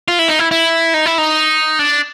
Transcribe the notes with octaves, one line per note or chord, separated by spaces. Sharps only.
F4
E4
D#4
E4
E4
D#4
E4
D#4
D4